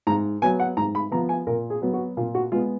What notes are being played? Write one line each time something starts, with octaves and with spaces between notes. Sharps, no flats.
G#2 A#5
F#3 B3 G#5
F#5
G#2 A#5
B5
F3 B3 A#5
G#5
A#2 A#4
G#4
F#3 B3
F#4
A#2 F4
F#4
G#3 B3 F4